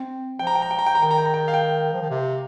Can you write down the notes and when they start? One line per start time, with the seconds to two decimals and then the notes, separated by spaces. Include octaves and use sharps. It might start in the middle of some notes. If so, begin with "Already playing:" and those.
Already playing: C4
0.39 F3 G5
0.47 A#5
0.55 G5
0.62 A#5
0.71 G5
0.79 A#5
0.86 G5
0.95 D#3 A#5
1.02 G5
1.11 A#5
1.18 G5
1.26 A#5
1.34 G5
1.48 F5
1.54 G5
1.93 F3
2.02 D#3
2.10 C3